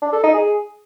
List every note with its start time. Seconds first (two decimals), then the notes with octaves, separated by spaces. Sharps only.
0.02 D4
0.13 A4
0.23 D#4
0.34 G#4